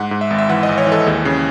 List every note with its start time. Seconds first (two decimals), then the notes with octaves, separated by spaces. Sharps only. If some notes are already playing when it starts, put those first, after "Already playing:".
Already playing: G#2 F#5
0.11 G#2
0.21 E5
0.30 G#1
0.38 E5
0.49 E3 F#5
0.63 D#5
0.69 G#1
0.78 C#5
0.87 E3
0.92 A4
1.06 D#2 G#4
1.25 C#3